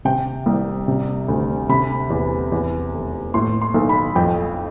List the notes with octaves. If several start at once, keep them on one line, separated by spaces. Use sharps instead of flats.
C3 G5
C2
C3
D2
C3 B5
E2
E2
F1
A2 C6
C6
B1
B5
F2 G5